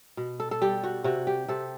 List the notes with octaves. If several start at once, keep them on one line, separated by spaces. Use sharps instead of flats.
B2
A4
A4
G3 G4
F#4
C3 F#4
G4
C3 A4